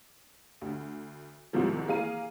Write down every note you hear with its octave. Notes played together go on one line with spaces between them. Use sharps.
D2
C2 G#2 C3 D#3 F3 G#3
E3 A#3 G#4 F5 A#5 D#7